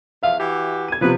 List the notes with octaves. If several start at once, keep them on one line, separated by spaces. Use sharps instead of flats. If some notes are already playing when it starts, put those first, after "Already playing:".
E2 F3 E5 F5
E3 F#4 G4
G#6 D#7
C3 F3 F#3 B4